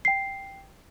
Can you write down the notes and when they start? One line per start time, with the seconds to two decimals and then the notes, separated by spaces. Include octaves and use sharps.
0.05 G5 C7